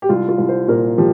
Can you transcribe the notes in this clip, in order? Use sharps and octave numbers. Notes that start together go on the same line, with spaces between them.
G4
C2 F4
F4
C2
C5
A#2 A#4
F3 G4